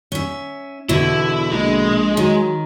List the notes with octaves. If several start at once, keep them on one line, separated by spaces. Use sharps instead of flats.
C#4 E5
E2 B2 D3 E4
A#1 G#3
D#3 F#3